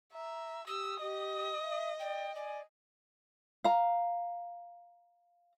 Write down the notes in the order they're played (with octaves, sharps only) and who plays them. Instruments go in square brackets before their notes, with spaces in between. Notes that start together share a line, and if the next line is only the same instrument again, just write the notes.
[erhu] E5 [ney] A#5
[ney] G4 [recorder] D#6 [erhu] E6
[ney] G4 [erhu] D#5
[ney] E5
[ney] D5 [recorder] G5
[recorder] D5 [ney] G#5
[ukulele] F5 A#5